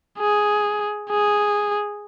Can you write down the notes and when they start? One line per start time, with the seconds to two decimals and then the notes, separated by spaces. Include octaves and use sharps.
0.19 G#4
1.10 G#4